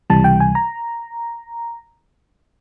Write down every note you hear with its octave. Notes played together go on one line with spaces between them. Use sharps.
C#2 C3 E3 G3 A5
G5
G#5
A#5